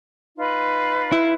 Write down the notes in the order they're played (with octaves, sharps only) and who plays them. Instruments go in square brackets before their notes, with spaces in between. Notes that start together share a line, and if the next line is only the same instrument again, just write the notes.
[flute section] D#4 F4 B4
[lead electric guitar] E4